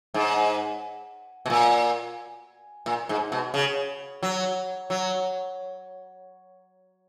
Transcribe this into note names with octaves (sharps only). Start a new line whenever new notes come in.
G#2
B2
A#2
A#2
G#2
B2
C#3
F#3
F#3